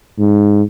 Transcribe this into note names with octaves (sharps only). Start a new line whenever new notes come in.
G#2